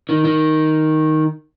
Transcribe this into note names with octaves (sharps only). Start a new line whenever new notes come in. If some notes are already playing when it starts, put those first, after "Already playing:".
D#3
D#3